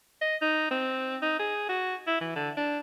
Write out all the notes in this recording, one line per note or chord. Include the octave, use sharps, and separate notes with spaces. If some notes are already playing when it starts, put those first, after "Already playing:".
D#5
D#4
C4
D#4
G#4
F#4
E4
E3
D3
D4